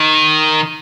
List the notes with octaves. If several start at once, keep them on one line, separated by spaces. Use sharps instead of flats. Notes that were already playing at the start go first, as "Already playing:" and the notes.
Already playing: D#3